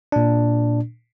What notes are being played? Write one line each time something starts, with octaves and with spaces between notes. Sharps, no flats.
A#2 D4